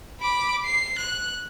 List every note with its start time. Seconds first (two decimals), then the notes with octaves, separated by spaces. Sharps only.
0.21 B5 D6
0.65 C7
0.98 F#6